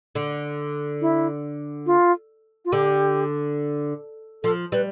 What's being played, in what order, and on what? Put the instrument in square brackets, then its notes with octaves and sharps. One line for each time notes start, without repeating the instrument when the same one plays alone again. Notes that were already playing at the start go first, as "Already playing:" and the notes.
[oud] D3
[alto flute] E4
F4
F4
[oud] D3 [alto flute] G4
[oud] F3 [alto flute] A4
[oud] G3 [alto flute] B4